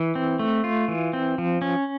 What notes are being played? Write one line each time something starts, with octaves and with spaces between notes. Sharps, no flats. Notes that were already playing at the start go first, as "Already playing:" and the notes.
Already playing: E3
C4
A3
F4
E3
C4
F3
C#4